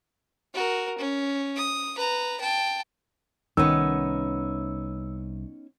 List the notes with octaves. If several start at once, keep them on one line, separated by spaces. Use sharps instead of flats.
F#4 A#4
C#4
D#6
B4 A#5
G5 A5
C2 D#3 B3 C#4 D#4 E6